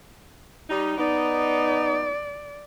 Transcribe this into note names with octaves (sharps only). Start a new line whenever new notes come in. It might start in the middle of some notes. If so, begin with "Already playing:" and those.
G3 D#4
B3 D#4 D5